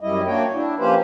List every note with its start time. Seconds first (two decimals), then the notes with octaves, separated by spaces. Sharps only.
0.01 F#2 G3 E4 D#5
0.27 A#3 D4 F#4 C#5 G5
0.53 D4 E4
0.79 F3 A#3 C#4 G4 B4 C5